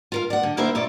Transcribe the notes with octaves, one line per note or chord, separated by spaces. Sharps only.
F4 A#4 F5
D5 F#5
D3
A#3 E4 A4 A#4 C5 E5
A#2 F4 C#5 D5